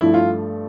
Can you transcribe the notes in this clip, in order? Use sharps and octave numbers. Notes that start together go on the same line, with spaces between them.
G2 F3 A3 E4
F4